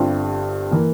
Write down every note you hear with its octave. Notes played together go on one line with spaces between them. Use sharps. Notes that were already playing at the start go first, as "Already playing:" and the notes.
Already playing: G1 G2 G3 C4 F4
E3 A#3